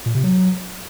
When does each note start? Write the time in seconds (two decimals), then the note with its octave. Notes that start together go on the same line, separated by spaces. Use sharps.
0.06 A#2
0.15 C3
0.24 F#3